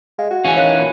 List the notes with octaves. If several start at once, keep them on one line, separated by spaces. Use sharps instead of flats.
G#3 F5
F#4
E3 C#4 F5 G#5
D#3 C#5 F5 F#6
A#2 E4 B5